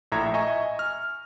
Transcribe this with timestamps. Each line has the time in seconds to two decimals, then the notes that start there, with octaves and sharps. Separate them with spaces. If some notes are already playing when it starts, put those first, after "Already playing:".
0.12 A#1 A2 E5 A#5 G#6 A#6
0.34 D#5 E5 G#5 A#5 C#6
0.79 F6